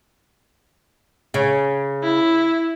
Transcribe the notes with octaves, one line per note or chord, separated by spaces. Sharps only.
C#3
E4